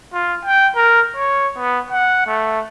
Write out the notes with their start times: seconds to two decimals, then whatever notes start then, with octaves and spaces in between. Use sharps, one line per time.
0.14 F4
0.45 G5
0.76 A#4
1.17 C#5
1.57 B3
1.91 F#5
2.27 A3